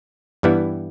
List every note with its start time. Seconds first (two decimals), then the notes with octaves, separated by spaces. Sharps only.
0.43 G2 E3 G3 B3 E4